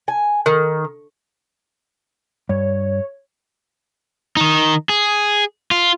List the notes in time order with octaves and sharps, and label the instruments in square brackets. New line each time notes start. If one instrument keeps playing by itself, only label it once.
[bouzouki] G#5
D#3
[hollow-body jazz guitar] G2 [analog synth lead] C#5
[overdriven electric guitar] D#3 D#4
G#4
F4